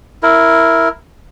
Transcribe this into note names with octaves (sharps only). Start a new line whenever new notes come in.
E4 A#4